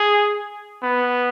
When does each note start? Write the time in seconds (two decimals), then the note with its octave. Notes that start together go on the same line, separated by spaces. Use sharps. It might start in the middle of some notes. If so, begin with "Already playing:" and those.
Already playing: G#4
0.83 B3